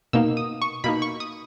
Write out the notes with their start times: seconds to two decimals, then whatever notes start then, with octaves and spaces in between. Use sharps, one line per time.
0.13 B2 A#3 D#4 E6
0.37 D#6
0.62 C#6
0.84 B2 A#3 D#4 B5
1.02 C#6
1.20 D#6